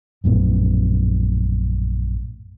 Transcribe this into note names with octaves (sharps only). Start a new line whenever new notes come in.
A#1 F#2 A2 B3